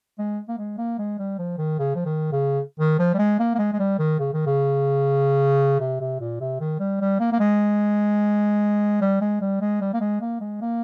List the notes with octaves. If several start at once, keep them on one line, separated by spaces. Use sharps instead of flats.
G#3
A#3
G#3
A#3
G#3
G3
F3
D#3
C#3
F3
D#3
C#3
D#3
F3
G3
G#3
A#3
A#3
G#3
G#3
G3
D#3
C#3
D#3
C#3
C3
C3
A#2
C3
D#3
G3
G3
A#3
A#3
G#3
G3
G#3
G3
G#3
G3
A#3
G#3
A#3
G#3
A#3